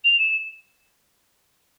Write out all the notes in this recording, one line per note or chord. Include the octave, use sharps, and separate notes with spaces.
F7
E7